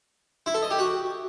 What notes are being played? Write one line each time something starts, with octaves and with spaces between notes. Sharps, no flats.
E4
A4
D#5
G4
F#4